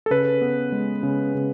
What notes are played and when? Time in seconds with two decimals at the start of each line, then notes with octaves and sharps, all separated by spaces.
0.06 A4
0.10 C#3 B4
0.41 B3
0.72 G#3
1.03 C#3
1.35 C#3